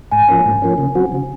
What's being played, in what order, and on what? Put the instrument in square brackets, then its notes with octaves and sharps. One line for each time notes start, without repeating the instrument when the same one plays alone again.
[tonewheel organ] G#2 [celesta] G#5
[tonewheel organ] F3 A#3 C#4
G#2
F3 A#3 C#4
C#3
F#3 C4 F#4
C#3